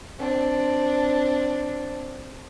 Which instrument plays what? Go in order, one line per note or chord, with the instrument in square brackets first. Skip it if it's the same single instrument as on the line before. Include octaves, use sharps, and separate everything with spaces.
[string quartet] C4 D4